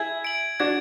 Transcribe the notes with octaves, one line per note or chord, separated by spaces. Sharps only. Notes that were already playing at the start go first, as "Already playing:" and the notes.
Already playing: E4 G#4 G#6
D7 F#7
D4 F#4 G#6